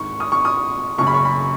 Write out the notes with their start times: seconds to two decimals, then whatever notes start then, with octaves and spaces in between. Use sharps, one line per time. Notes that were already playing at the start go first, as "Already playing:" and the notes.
Already playing: G#1 G#2 D#3 C#6
0.20 D#6
0.32 C#6
0.45 D#6
0.98 F#1 F#2 C#3 C#6
1.07 B5
1.14 C#6
1.25 B5